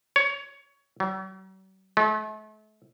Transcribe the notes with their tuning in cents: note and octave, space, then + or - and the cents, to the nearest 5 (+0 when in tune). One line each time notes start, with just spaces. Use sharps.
C#5 +15
F#3 +45
A3 -40